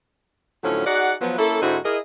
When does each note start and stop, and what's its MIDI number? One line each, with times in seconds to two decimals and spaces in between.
0.64 0.85 45
0.64 0.85 50
0.64 0.85 53
0.64 0.85 54
0.64 0.85 61
0.86 1.14 63
0.86 1.14 66
0.86 1.14 68
0.86 1.14 74
0.86 1.14 78
1.21 1.36 53
1.21 1.36 54
1.21 1.36 59
1.38 1.61 58
1.38 1.61 61
1.38 1.61 64
1.38 1.61 69
1.62 1.78 44
1.62 1.78 50
1.62 1.78 60
1.62 1.78 63
1.62 1.78 64
1.62 1.78 66
1.85 1.97 64
1.85 1.97 68
1.85 1.97 70
1.85 1.97 75